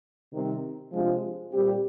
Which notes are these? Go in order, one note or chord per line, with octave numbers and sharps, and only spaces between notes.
C3 D#3 G3 C4
C3 F3 G#3 D4 F4
A#2 G3 C4 G4